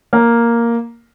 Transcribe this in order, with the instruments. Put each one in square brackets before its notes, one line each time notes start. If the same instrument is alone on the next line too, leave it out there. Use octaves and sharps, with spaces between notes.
[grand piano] A#3